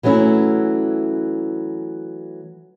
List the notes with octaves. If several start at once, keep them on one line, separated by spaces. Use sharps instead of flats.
E3 F#3 A3 C#4 E4